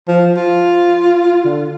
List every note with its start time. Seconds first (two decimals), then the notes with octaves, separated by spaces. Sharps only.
0.08 F3
0.37 F4
1.45 D3